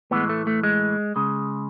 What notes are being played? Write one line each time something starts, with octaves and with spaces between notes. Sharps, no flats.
A2 E3 G#3 B3
A3
A3
G#3
C#3 G#3